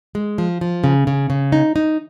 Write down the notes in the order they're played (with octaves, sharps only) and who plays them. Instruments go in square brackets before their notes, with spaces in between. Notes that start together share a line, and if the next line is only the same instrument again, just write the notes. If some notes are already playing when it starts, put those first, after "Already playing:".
[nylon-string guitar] G#3
F3
F3
C#3
C#3
C#3
D#4
D#4